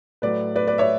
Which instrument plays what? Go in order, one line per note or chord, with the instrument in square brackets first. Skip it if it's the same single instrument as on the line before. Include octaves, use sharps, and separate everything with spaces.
[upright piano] A2 F#3 B4 D5
B4 D5
B4 D5
C#5 E5